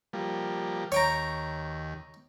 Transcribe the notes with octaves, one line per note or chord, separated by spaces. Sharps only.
F3 G3 A#3
D#2 C#5 G5 A#5